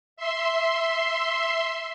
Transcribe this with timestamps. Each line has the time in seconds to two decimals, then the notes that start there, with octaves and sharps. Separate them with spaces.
0.16 E5 C6